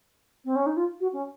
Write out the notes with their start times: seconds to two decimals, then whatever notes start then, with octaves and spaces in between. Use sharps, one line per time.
0.44 C4
0.55 C#4
0.66 D#4
0.76 F4
1.00 F#4
1.13 C#4